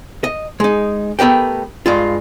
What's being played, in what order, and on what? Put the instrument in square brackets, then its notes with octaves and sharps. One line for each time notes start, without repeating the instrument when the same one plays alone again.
[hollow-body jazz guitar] D#5
G#3 D#4
A3 B3 G4 A#4 G5
G2 G#3 F4